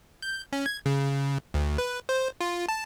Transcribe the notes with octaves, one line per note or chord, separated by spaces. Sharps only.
G6
C#4
G#6
C#3
D2
B4
C5
F4
A5